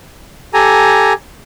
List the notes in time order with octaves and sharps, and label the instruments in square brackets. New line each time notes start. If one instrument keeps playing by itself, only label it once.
[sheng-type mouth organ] G4 A4 G#5 A#5